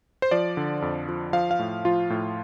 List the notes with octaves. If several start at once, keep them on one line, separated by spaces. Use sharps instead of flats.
C5
F3 D5
D3
F2
F3
F3 F5
F5
A2
F3 F4
A2